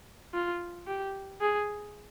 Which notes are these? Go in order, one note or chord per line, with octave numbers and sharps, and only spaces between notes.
F4
G4
G#4